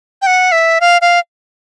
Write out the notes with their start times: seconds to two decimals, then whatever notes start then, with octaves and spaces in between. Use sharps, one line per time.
0.22 G5
0.27 F#5
0.52 E5
0.81 F5
1.01 F5